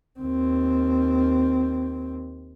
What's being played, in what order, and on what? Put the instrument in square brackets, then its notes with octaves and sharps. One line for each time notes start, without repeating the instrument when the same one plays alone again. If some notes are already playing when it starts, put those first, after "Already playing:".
[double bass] D#2 C4